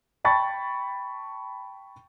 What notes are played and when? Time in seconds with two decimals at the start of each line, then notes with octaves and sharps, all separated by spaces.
0.24 G5 A5 B5 C#6 A6